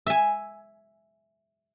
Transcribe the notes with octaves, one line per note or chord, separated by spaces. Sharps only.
E5 G#5